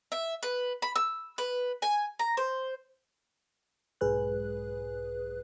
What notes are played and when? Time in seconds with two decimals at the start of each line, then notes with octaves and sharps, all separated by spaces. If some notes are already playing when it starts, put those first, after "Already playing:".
0.12 E5
0.43 B4
0.82 B5
0.96 E6
1.38 B4
1.82 G#5
2.19 A#5
2.37 C5
4.01 B1 G#2 G#4 B4 F#6